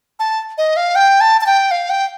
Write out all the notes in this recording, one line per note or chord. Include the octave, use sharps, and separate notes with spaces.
A5
D#5
F5
G5
A5
A5
G5
F5
G5